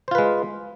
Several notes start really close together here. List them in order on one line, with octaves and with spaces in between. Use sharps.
C5 F4 B4 G#3